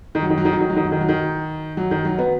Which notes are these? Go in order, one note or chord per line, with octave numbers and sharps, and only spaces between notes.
D#3
F#3
D#3
F#3
D#3
F#3
D#3
F#3
D#3
F#3
D#3
F#3
D#3
F#3
D#3
F#3
B3